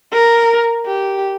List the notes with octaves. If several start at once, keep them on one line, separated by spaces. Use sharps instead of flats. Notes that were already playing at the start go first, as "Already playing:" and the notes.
A#4
G4